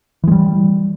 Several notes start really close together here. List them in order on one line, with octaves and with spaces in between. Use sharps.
E3 G#3 G3